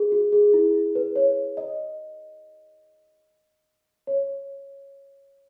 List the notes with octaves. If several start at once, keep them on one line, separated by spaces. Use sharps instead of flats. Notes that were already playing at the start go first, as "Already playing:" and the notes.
Already playing: G#4
F#4
G#4
E4
B4
C#5
D#5
C#5